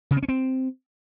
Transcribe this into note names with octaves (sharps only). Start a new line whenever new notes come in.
C#3
C4
C#4
C4